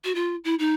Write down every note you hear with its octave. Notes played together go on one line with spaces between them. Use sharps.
F#4
F4
E4
D#4